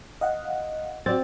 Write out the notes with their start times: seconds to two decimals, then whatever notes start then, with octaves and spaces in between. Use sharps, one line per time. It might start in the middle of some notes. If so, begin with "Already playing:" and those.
0.21 D#5 F5 F#5
1.06 C4 F#4 D5 A6